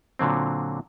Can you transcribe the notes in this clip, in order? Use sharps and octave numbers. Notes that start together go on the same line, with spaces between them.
A#2 D3 F#3 C4